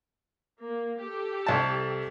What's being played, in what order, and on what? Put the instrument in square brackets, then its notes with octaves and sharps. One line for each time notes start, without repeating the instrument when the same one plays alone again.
[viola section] A#3
G4 A4
[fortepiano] C2 A5